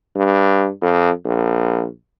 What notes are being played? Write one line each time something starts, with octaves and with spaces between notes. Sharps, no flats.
G2
F2
A#1